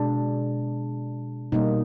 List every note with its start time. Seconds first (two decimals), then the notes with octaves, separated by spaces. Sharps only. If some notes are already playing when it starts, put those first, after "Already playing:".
Already playing: B2 G#3 D4
1.52 B2 G3 A#3 D#4